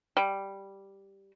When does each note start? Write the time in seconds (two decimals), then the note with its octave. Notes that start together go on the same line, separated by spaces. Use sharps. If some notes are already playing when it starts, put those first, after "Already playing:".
0.17 G3